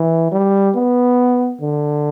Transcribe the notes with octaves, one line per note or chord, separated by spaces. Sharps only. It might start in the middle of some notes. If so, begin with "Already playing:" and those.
Already playing: E3
G3
B3
D3